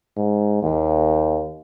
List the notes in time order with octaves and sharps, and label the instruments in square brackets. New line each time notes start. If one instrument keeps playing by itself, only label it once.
[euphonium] G#2
D#2